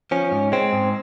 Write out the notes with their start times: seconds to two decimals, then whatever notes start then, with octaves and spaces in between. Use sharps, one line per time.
0.11 F3 C#4
0.32 G#2
0.52 G#3 C4
0.73 G#2